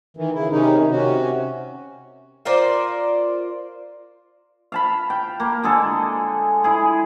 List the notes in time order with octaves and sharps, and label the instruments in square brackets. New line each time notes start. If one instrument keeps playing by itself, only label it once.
[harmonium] D#3 E3
C#3 E4
C3 D#3 C#4 D#4
C3 C#4 F#4
[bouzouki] F4 A#4 C5 D5
[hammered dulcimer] F5 A5 B5
G5
A#3
D3 G#3 G#4 A4
E4 G#4